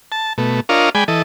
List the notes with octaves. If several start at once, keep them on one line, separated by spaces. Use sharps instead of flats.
A5
B2 A3
D4 F4 A#4 C#5 D#5 F5
G#3 D5 G5 G#5 B5
E3 A4 D#5